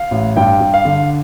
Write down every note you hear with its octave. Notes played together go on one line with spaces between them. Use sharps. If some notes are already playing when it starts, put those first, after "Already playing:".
Already playing: F5
A1
G2 G5
G2
F5
D3